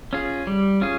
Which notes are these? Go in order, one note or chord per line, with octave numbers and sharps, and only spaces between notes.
C#4 F4 G#4
G3
C#4 F4 G#4